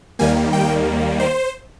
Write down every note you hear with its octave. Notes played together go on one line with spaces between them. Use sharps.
D#2 D#3 G3 A#3 G#5
G5
C5